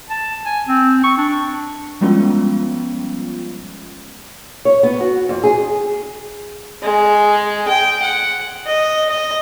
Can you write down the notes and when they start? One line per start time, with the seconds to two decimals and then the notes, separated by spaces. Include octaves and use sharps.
0.10 A5
0.45 G#5
0.68 C4
1.04 C#6
1.17 D4
2.01 F3 G3 G#3 B3 C#4 F4
4.65 C#5
4.83 B3
5.01 F#4
5.29 F2
5.44 G#4
6.82 G#3
7.68 G5
8.02 F#5
8.66 D#5
9.09 D#5